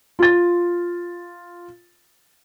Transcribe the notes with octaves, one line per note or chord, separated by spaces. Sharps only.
F4 A6